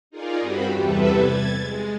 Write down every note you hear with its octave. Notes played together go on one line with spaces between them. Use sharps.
D#4 F4 G#4 A#4 D5
G2 C4 F#4 G4 B5
E2 C3 G3 A4 B4 E5
G#6 A6
G#3